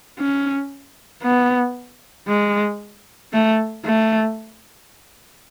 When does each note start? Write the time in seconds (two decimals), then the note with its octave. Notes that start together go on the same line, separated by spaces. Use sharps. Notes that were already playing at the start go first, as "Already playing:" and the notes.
0.19 C#4
1.23 B3
2.28 G#3
3.33 A3
3.85 A3